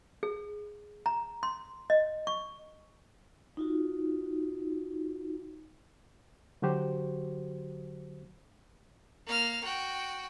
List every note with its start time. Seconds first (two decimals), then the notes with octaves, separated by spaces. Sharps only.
0.23 G#4
1.06 A#5
1.43 C6
1.90 D#5
2.27 C#6
3.57 D#4 F4 F#4
6.62 D3 F#3 F#4 G4 C5
9.26 A#3 F6
9.64 F#4 G5